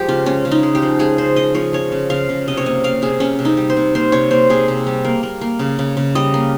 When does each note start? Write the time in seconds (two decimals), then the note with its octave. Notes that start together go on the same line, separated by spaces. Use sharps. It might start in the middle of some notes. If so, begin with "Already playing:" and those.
Already playing: F3 G#3 G4
0.08 C#3 F4
0.26 G#3 C#4
0.45 C#3
0.51 D#4
0.63 G#3
0.75 G4
0.82 F3
0.99 G#3 G#4
1.18 C#3 C5
1.36 F3 D#5
1.54 F3 C#5
1.73 G#3 C#5
1.92 C#3
2.10 C#3 F5
2.29 C#3
2.48 C3 D#5
2.57 C#5
2.66 A#3 D#5
2.84 A#3 F5
3.02 C3 G#4
3.20 C3 C#4
3.39 C3
3.45 D#4
3.57 G3
3.70 C5
3.77 C3
3.95 A#3 C5
4.12 C3 C#5
4.31 A#3 C5
4.50 C3 G#4
4.68 C3
4.87 G3
5.05 A#3
5.23 A#3
5.41 A#3
5.59 C#3
5.79 C#3
5.97 C#3
6.15 G3 D#5
6.34 A#3